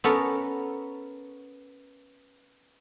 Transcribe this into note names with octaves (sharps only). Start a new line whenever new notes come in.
B3 C#4 A4 A#4